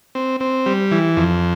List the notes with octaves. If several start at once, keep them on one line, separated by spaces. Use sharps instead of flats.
C4
C4
G3
E3
F2